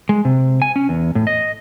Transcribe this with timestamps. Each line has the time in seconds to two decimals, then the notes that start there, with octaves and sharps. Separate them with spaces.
0.09 G#3
0.25 C3
0.62 G#5
0.76 C#4
0.89 E2
1.15 A2
1.27 D#5